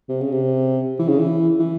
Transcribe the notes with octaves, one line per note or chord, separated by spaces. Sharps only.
C3
C#3
C3
E3
C#3
E3
E3